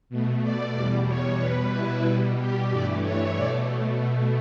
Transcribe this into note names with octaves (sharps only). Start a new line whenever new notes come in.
B2 A3
D5
E2 B2 G3 D5
C#5
B2 G3 B4
E4
B2 G3
G4
G2 E3 A3 D5
C#5
B2 A3 D5